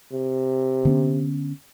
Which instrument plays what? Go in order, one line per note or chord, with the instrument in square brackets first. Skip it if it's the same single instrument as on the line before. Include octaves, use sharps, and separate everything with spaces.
[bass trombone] C3
[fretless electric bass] D3 B3 C#4